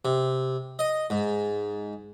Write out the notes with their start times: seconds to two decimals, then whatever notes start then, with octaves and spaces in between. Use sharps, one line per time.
0.05 C3
0.79 D#5
1.10 G#2